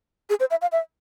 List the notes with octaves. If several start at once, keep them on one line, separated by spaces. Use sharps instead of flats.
G#4
C5
E5
F5
E5